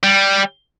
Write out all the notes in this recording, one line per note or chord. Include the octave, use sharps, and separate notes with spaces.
G3